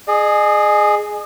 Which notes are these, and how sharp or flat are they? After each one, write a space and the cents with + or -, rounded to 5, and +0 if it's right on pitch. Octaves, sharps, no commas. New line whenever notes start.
G#4 +10 D#5 -35